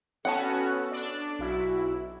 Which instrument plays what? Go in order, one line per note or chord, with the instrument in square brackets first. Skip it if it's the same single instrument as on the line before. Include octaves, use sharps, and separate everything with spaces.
[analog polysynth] B3 C#4 F#4 [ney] A4 [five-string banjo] F#5 G5 A5
[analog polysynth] D4 D5
[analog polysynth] B1 E4 [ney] F#4